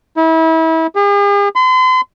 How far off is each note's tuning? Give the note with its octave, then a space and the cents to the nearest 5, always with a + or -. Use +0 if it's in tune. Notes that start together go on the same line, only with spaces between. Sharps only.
E4 -30
G#4 -45
C6 -40